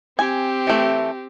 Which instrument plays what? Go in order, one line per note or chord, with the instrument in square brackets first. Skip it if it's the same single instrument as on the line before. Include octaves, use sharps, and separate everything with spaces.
[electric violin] C4 G4 [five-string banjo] G#5
[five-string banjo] E3 A3